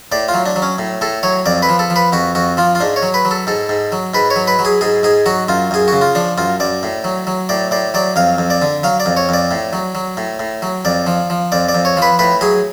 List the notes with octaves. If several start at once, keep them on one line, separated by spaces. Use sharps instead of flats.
A2 D5
F4
F#3
D4
F#3
C#4
A2
A2 A4
F#3 C#5
F2 D5
B4
F3
A4
F3
B4
F2 F#4
F2 F#4
F3 F4
F4
G#2 D4
C#5
F#3
B4
F#3
A4
G#2 A4
G#2
F#3
G#2 B4
C#5
F#3
B4
F#3
G#4
G#2 G#4
G#2 G#4
F#3 F#4
F#2 F4
F#2 G#4
C#3 F#4
F4
F3 D4
F#2 F4
F#2 D5
A2
F#3
F#3
A2 D5
A2 D5
F#3 D5
F2 F5
F2
D5
D3
F#3 F5
D5
F2
C#5
F2 D5
A2
F#3
F#3
A2
A2
F#3
F2 D5
F3
F3
F2 D5
D5
F2
C#5
F3 B4
A2 B4
F#3 G#4